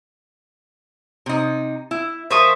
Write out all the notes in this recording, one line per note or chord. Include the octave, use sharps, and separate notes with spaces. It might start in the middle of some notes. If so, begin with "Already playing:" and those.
C3 D#4
E4
F3 A#4 C5 E5 C#6 D#6